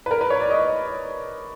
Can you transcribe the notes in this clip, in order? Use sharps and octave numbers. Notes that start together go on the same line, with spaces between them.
B4
A#4
B4
C#5
D5
D#5